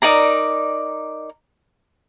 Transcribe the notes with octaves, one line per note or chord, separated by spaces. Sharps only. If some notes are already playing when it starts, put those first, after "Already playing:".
D#4 A#4 D5 A#5